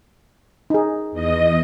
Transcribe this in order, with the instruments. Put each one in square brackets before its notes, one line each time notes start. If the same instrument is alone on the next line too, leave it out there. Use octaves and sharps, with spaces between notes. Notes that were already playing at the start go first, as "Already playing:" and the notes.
[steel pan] D#4 G#4
[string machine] E2 D#5